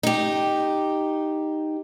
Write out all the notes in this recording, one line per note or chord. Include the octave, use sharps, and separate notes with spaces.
D#4 G4